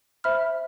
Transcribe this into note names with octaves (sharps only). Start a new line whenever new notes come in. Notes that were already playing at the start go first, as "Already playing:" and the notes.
C5 E5 B5 F6